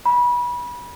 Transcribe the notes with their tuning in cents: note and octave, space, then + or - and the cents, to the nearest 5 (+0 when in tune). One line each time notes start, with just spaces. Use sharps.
B5 -25